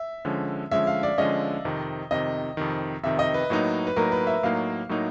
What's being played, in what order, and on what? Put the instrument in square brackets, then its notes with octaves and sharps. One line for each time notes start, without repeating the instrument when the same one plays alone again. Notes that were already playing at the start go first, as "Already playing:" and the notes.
Already playing: [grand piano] E5
[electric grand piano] D3 F3 G#3 C#4
[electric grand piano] D3 F3 G#3 C#4 [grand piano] E5
[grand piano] F5
D5
[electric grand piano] D3 F3 G#3 C#4 [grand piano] D#5
[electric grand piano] F2 C3 D#3
[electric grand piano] F2 C3 D#3 [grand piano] D#5
[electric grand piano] F2 C3 D#3
[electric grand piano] F2 C3 D#3 [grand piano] E5
[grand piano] D#5
B4
[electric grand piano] A2 F#3 A#3 D#4
[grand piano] B4
[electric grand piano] A2 F#3 A#3 D#4 [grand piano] A#4
[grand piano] B4
E5
[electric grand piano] A2 F#3 A#3 D#4 [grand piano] F5
[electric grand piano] A2 F#3 A#3 D#4